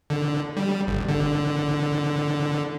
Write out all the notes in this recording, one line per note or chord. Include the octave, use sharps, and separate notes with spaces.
D3
G3
G1
D3